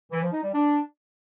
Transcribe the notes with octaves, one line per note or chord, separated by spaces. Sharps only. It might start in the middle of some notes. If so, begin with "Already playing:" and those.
E3
F3
D#4
G3
D4